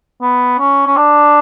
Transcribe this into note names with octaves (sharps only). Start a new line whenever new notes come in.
B3
C#4
C#4
D4